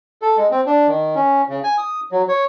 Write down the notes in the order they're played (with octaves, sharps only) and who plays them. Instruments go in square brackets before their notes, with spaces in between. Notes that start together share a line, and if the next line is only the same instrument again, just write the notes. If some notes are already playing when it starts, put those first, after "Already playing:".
[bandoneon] A4
G#3
C4
D4
D#3
C#4
C#3
G#5
D#6
F#3
C#5